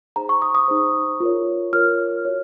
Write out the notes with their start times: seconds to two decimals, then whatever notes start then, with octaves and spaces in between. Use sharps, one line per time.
0.16 D#4 G#4 C5 A#5
0.29 C#6
0.42 D#6
0.55 D#6
0.68 D#4 G#4 C5
1.20 F4 A#4 C#5
1.73 F4 A#4 C#5 F6
2.25 F#4 C#5